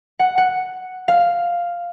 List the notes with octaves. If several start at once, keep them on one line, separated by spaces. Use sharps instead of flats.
F#5
F#5
F5